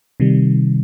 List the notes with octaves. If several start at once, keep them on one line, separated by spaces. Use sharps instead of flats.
C3 D#3 G3